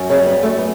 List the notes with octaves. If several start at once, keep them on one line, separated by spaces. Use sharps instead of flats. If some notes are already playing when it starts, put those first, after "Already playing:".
Already playing: F#2
C#3 C#4
G3
B3
F#2 A3
B3